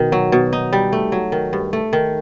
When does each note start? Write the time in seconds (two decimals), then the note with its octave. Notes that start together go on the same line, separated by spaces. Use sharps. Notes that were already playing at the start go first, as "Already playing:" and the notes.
Already playing: B2 D#3
0.12 F#3
0.32 B2
0.53 D#4
0.73 G3
0.93 A3
1.12 F#3
1.32 D#3
1.53 G2
1.73 A3
1.93 D#3